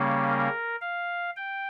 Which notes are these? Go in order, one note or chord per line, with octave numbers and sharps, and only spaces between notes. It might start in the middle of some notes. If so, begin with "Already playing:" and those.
Already playing: C#3 G3 A#3 C#4
A#4
F5
G5